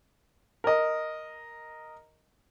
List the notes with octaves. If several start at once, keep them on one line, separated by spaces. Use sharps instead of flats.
A#4 D#5